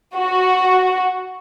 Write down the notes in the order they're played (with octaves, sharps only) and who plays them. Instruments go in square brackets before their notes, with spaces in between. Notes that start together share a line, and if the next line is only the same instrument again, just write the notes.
[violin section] F#4